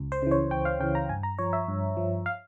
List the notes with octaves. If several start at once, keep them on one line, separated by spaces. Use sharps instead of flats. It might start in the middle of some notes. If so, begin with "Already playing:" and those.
Already playing: C#2
C5
C#3 E3
C#5
C#2 G5
F5
C#3 E3 G5
A#5
G2 G#5
A#5
F3 C#5
E5
G2
F3
F5